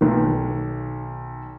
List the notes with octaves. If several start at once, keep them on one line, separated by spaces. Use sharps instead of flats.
B1 D#3